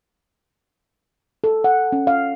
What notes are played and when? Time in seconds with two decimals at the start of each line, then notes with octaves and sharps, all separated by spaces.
1.44 A4
1.64 F#5
1.92 C#4
2.07 F5